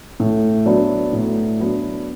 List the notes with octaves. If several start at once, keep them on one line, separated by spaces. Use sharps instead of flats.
A2
F#3 B3 D4
A2
F#3 B3 D4